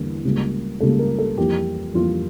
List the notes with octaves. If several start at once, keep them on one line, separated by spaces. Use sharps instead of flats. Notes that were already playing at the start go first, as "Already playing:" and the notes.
Already playing: E2 D3 G3 A#3
C#2 C#3 G3 A#3
C#2 C#3 G3 A#3 A4
A#4
A4
F2 E3 G3 A#3 G4
F2 E3 G3 A#3 F4